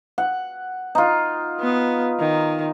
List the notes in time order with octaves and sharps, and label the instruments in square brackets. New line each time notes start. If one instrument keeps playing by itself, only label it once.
[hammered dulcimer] F#5
D#4 F4
[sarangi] B3
D#3